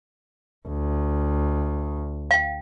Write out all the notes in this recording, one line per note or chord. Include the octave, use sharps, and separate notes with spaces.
D2
F5 G5